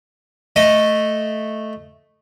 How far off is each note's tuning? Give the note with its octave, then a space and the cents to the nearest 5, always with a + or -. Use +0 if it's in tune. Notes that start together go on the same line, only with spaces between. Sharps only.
A3 +0 D#5 +0